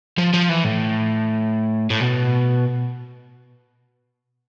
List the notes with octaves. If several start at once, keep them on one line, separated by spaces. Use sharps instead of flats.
F3
F3
E3
A2
A2
B2